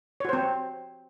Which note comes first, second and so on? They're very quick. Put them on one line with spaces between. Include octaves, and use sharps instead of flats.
C#5 F#4 C5 C4